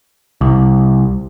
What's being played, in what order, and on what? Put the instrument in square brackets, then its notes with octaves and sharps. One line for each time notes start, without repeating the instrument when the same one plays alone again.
[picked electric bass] C2